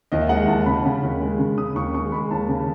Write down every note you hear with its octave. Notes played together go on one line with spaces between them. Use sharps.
D#2 D#5
E5
G#3 F#5
D#2 A5
C#3 B5
C#3
D#2
G#3
C#3
C#3 D#6
D#2 C#6
G#3 C#6
G#3 B5
D#2 A5
C#3